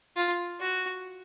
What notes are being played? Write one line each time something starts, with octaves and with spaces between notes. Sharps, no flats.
F4
F#4